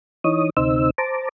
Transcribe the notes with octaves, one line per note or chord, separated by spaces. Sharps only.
E3 D#4 C#5 D#6
D2 C3 D#4 C5 E6
C5 A5 A#5 D6